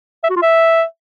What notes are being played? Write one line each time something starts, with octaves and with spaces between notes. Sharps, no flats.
E5
F#4
F4
E5